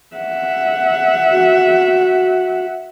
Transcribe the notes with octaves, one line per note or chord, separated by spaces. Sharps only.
E5 F#5
F#4